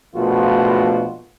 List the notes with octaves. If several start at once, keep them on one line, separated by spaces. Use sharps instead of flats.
A#1 B2 A3 F4 F#4